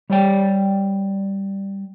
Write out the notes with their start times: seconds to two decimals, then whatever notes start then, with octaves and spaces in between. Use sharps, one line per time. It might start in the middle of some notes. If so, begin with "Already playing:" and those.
0.10 G3 C#5 D5 G5